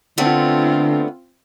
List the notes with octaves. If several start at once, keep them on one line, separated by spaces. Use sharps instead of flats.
D3 A3 B3 C4 D4 F4